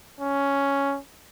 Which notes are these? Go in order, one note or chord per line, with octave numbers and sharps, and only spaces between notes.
C#4